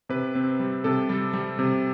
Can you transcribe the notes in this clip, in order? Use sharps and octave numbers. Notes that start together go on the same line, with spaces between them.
C3 B4
C4
G3
C3 A4
G3
G3
C3